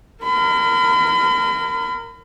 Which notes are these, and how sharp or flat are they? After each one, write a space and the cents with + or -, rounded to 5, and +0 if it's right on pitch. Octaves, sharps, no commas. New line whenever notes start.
A#4 -15 B5 +40